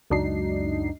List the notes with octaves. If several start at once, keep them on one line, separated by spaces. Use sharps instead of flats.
C#2 F#2 D4 D#4 F#4 C7